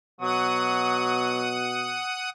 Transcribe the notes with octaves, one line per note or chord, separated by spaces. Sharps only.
B2 F#3 F#5 D#6